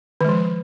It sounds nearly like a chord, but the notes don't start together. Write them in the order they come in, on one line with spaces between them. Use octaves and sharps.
D#3 G#3 F3